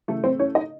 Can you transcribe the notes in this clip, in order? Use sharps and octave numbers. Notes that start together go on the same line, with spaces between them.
C#3 E3 A3 A4
C4 C5
C#4 C#5
D#4 D#5